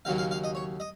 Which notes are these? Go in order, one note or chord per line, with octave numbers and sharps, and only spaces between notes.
D#2 C#3 F#3 A#3 F5
F5
F5
D#5
C#5
D#5